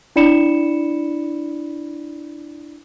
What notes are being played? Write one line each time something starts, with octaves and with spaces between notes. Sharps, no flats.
D4 E4 D5 B5 C#7 E7